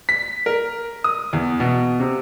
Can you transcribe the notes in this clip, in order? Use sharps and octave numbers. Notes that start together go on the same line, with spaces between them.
B6
A#4
D#6
E2
B2
C3